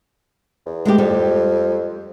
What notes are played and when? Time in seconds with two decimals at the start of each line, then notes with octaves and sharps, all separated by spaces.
0.66 E2
0.85 G#3 A3 G4
0.98 F2 G3